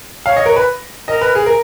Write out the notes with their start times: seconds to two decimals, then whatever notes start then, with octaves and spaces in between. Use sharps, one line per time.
0.26 C#5 F5
0.36 D#5
0.46 A#4
0.56 B4
1.08 A#4 D#5
1.21 B4
1.35 G#4
1.46 A#4